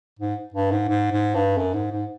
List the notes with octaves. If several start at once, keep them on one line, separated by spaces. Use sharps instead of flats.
G#2
G2
G#2
G#2
G#2
G2
F#2
G#2
G#2